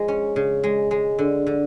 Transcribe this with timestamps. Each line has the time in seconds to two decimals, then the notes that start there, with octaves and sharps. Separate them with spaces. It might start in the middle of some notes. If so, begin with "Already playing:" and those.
Already playing: F3 G#3
0.08 C#4
0.36 C#3
0.64 G#3
0.91 G#3
1.19 D3
1.47 D3